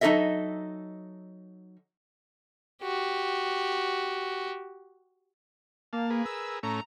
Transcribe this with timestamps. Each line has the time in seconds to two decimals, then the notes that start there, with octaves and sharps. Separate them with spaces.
0.01 F#3 D#4 G4 A4 D#5 E5
2.82 F#4 G4
5.93 A#3 F5 A5
6.10 G#4 A#4 B4
6.26 E6
6.63 A2 A3 C#4 A#5